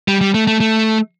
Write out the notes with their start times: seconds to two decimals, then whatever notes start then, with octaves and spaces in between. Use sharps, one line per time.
0.08 G3
0.21 G3
0.34 A3
0.47 A3
0.60 A3